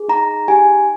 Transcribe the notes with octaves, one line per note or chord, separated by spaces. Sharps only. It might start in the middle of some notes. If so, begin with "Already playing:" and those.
Already playing: G#4
D#4 A#5
G4 G#5